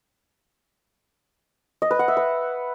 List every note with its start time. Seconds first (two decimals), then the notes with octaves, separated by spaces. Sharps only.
1.82 D#5
1.91 B4
1.99 F#5
2.08 E5
2.17 B4